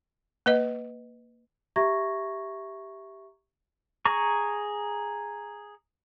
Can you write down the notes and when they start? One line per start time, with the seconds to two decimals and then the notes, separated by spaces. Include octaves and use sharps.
0.46 A#3 B4 D#5
1.76 G4 E5 A#5 C#6 G#6 A#6
4.05 G#4 A#5 C#6